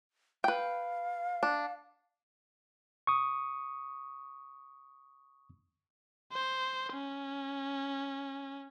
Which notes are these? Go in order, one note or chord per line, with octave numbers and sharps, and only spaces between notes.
B4 F5 G5
D4
C#6 D#6
C5
C#4